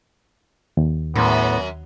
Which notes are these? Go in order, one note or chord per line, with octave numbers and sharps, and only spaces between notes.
D#2
F#2 A2 B3